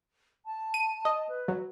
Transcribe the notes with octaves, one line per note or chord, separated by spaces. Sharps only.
A5
D#7
D#5
B4
F#3